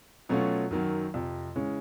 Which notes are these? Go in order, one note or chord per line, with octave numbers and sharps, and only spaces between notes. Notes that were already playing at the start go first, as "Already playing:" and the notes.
B2 F#3 A3 C#4 F4
F#2 D#3 F#3
F2 C3 F3
C#3 E3 G#3 C#4